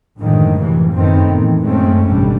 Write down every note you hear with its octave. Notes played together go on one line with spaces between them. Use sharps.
F#2 A2 D3 D#3 F3 G#3
F#2 C3 E3 F3
F1 F#2 D#3 A3 B3 C4
A2 E3
F#2 G#3 A3 C4 C#4
G#1 D2 B2 D3 G3